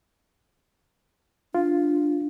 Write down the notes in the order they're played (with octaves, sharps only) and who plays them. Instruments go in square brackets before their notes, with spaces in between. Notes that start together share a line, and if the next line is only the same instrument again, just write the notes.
[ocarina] D4 [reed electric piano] F4